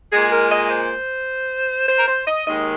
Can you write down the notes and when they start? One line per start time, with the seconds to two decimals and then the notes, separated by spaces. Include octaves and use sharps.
0.12 A#2 G#3 G#4
0.32 A#4
0.52 D#5
0.71 C5
1.88 C5
1.98 A#4
2.08 C5
2.27 D#5
2.46 D#2 D#3 G#3 D#5